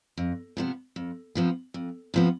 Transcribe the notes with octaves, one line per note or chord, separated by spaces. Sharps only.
F2
C3 F3 B3
F2
C3 F3 B3
F2
C3 F3 B3